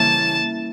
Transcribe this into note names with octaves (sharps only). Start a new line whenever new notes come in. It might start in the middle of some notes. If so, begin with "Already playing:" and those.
Already playing: C#3 E3 G3 A#3 A5